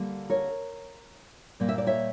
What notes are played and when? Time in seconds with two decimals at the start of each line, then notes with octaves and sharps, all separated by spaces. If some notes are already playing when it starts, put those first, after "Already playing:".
Already playing: D3 G3 A#3
0.30 A#4 C#5
1.60 A#2 G3 A#3
1.69 E5
1.78 D5
1.87 C#5 E5